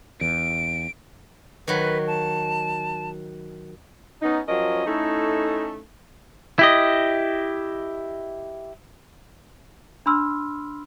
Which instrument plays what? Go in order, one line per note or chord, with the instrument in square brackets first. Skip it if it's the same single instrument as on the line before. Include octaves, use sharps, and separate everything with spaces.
[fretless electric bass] E2 [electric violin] D7
[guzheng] D#3 F#3 [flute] B4
[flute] A5
[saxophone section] B3 C#4 D#4
F3 F#3 C#4 A#4 D#5
A3 C#4 D#4 E4 A4
[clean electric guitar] E4 G4 D#5
[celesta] D4 B5 C6 E6 F6